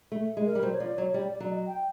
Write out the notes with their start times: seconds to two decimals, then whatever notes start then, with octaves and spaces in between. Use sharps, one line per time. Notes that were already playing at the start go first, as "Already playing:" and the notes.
0.12 A3
0.37 G#3
0.46 A#4
0.55 G3
0.63 F#3 C5
0.74 C#5
0.80 F3 D5
0.97 F#3 C#5
1.14 G3 D5
1.32 D5
1.40 F#3
1.49 D#5
1.66 G5